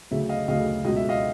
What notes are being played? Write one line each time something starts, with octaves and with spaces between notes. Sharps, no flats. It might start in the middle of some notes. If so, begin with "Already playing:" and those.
D2 C#3 F#3 E5
D#5 F5
D2 C#3 F#3 D#5 F5
C#2 B2 F#3 D#5
E5
D#5 F5